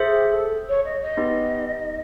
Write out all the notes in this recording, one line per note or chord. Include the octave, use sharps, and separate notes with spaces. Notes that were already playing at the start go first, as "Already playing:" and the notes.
Already playing: G#4 C5 E5
G4
A4
C#5
D#5
D#5
B3 D#4 G4 B4